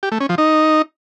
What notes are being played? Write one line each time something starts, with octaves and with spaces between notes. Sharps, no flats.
G4
A3
C#4
F3
D#4